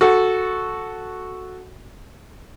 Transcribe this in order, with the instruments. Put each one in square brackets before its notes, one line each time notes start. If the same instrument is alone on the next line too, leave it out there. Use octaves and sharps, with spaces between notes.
[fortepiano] F#4 A4